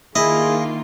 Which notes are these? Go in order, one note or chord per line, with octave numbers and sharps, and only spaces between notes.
D#3 A#3 E4 F4 G#4 D#5